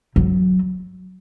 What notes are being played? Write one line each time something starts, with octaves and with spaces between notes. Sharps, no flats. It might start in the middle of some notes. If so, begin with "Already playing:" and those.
F#3